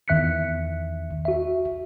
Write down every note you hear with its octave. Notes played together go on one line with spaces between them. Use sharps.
E2 D#3 E5 F#6 B6 C#7
F#4 E5